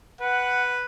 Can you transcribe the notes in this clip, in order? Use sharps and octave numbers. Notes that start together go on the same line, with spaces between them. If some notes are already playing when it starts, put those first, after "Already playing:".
B4 F#5